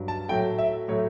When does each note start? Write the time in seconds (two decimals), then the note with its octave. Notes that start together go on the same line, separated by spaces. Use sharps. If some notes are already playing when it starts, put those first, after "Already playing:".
Already playing: G2 F#3
0.08 A5
0.28 A2 F#3 A3 G5
0.59 E5
0.88 A2 F#3 A3 C#5